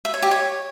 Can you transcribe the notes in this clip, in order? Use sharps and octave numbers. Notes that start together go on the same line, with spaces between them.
E5
C#5
G4
C#5